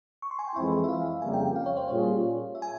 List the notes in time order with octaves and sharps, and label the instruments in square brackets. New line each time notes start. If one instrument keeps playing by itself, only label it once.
[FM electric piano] C#6
C6
G#5
G5
[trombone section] F2 E3 G#3 C4 E4 [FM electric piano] E5
[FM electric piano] E5
F5
[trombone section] F2 C#3 G3 A#3 [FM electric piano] G#5
[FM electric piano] G5
F5
C#5
C5
[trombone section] A#2 G3 C#4 F4 G#4 [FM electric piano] C#5
[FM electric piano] E5
G#5